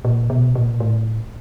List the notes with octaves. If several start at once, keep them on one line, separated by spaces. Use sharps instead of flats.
A#2
B2
A#2
A2